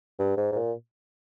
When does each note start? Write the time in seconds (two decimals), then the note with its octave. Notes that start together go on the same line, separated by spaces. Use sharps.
0.19 G2
0.37 G#2
0.52 G#2
0.56 A#2